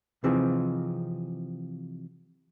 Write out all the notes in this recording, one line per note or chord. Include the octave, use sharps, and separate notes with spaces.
C3 E3 F3 C4 D#4 G#4